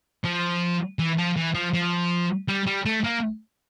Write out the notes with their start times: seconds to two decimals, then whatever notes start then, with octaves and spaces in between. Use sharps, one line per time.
0.25 F3
0.99 E3
1.18 F3
1.37 E3
1.55 F3
1.74 F3
2.48 G3
2.67 G3
2.85 A3
3.04 A#3